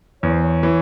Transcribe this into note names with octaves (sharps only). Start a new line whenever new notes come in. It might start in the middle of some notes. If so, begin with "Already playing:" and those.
E2 C#5
C5
C#5
E3